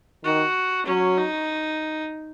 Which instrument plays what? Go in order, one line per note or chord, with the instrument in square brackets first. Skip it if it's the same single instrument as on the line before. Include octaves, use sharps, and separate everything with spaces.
[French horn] D#3 [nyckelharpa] F#4
[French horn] F#3 [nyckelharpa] C#4
[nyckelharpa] D#4